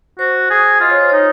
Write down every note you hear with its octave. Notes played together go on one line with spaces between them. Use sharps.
F#4 C5
G#4
F4 D#5
C#5
C5
D#4 C#5